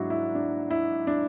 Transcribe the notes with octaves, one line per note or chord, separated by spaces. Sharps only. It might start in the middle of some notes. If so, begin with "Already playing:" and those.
Already playing: G#2 F#3 D4 E4 F#4
E4
D4
E4
D4